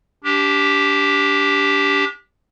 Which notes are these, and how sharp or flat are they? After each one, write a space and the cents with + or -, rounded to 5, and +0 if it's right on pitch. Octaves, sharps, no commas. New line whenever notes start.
D4 -25 G4 +0